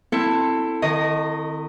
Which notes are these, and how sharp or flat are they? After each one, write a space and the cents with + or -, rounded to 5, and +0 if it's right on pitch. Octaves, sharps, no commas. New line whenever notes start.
C4 +0 E4 +0 A4 +15
D#3 -30 D#5 +0 C#6 +0